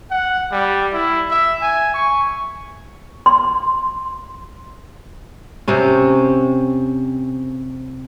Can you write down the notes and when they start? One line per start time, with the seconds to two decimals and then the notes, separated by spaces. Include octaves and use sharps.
0.11 F#5
0.52 G3
0.93 E4
1.30 E5
1.62 G#5
1.94 C#6
3.26 C6
5.68 C3 C4 C#4